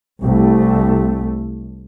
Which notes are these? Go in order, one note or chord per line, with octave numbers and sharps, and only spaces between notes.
C2 A3